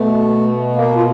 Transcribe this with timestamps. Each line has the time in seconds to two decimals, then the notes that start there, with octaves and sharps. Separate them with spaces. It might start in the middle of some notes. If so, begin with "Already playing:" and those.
Already playing: B2 A3
0.76 A#3
0.96 F4